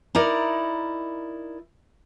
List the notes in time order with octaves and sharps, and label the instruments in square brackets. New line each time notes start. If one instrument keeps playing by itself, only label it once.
[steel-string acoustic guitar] D#4 E4 A#4 D5